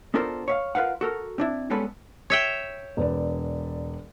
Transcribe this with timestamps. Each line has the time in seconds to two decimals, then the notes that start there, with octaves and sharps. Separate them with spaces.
0.14 B3 D4 F4 A4 A#4 C5
0.48 C#5 E5 F5
0.75 F4 A#4 B4 F5 F#5
1.01 F#4 A4 A#4
1.38 C4 D4 E4
1.70 G3 G#3 B3 C#4 A4 B4
2.30 C#5 E5 G5
2.97 E1 B4 D5